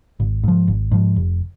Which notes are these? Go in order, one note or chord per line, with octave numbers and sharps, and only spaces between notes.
G#1
G#2 F3
G#1
G#2 F3
F1